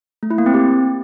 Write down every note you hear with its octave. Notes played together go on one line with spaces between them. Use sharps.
A3
E4
A#3
C4
G4